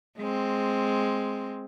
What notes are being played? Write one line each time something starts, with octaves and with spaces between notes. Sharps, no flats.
G#3 C4